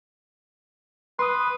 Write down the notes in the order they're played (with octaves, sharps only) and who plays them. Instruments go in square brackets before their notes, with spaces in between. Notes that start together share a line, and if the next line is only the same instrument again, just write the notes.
[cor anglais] B4 [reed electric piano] C6 D#6